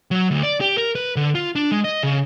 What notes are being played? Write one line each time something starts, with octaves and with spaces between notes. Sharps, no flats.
F#3
D2
D5
G4
A#4
B4
D3
F4
D4
G#3
D#5
C#3